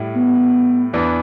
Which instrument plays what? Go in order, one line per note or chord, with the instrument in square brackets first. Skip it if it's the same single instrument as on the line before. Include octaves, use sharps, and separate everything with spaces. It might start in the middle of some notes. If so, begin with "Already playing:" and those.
Already playing: [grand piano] A2 G3 E4
[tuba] B3
[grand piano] E2 E3 B3 D4